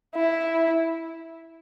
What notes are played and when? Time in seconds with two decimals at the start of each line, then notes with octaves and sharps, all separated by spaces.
0.15 E4